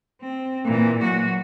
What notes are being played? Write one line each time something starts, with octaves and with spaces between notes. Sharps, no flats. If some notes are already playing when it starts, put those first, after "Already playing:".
C4
A#2 E3
F#3 F#4